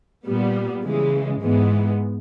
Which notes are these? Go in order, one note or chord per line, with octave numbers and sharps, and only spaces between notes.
A#2 G3 B3
C#3 E3 G#3
G#2 E3 G#3 B3